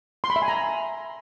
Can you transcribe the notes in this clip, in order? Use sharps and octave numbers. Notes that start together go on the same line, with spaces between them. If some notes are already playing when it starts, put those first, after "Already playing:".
C6
B5
E5
G#5
A#5